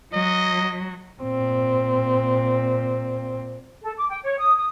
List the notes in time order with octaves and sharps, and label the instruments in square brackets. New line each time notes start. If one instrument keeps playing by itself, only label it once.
[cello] F#3 [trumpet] D#5
[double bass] A#2 C4
[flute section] A4
D6
G5
C#5
D#6
D#6